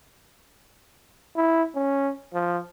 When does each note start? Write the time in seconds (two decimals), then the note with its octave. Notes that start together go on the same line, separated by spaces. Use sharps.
1.36 E4
1.75 C#4
2.34 F3